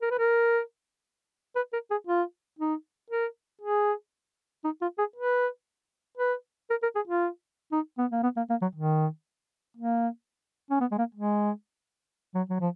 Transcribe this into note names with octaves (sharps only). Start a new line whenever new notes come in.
A#4
B4
A#4
B4
A#4
G#4
F4
D#4
A#4
G#4
D#4
F4
G#4
B4
B4
A#4
A#4
G#4
F4
D#4
B3
A#3
B3
A#3
A#3
F#3
D#3
A#3
C#4
B3
G#3
A#3
G#3
F#3
F#3
F3